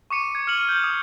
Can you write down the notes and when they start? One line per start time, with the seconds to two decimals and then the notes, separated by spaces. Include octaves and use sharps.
0.10 C#6 D6 C#7 D#7
0.35 G#6
0.47 F6 C#7 F#7
0.69 G6
0.84 D#6